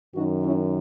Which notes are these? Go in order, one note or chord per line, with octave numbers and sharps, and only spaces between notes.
F#2 D#3 D#4 F#4
C#4 E4